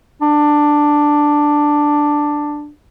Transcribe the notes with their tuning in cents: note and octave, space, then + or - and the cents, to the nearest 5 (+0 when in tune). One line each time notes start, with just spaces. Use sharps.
D4 +5